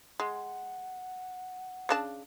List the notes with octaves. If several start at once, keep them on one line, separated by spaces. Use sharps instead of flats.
G#3 F#5
C#3 D4 A5